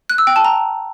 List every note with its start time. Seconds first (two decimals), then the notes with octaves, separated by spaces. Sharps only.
0.10 F#6
0.18 E6
0.27 G5
0.36 A5
0.45 A#5